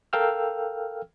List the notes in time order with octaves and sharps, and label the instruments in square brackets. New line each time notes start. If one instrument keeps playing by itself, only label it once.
[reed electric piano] A4 A#4 F5 G5 E6 F6